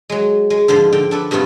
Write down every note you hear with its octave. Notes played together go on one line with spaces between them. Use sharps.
F#3 G#3
G#3
G#2 D3 F3 C5
D3 G5
D4 A4 B4
G2 C3 A3 B3 F4